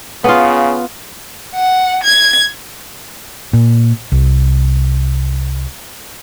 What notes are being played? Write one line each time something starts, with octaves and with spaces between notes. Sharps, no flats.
C#3 B3 F4
F#5
G#6
A#2
C2